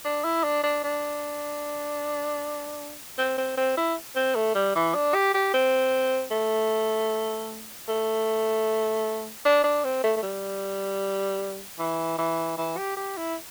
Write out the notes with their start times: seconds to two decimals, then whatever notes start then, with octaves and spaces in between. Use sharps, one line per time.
0.05 D4
0.24 E4
0.44 D4
0.64 D4
0.84 D4
3.18 C4
3.38 C4
3.57 C4
3.77 E4
4.16 C4
4.36 A3
4.55 G3
4.75 E3
4.95 D4
5.14 G4
5.34 G4
5.54 C4
6.31 A3
7.88 A3
9.45 D4
9.64 D4
9.84 C4
10.04 A3
10.17 A3
10.23 G3
11.79 E3
12.18 E3
12.58 E3
12.78 G4
12.97 G4
13.17 E4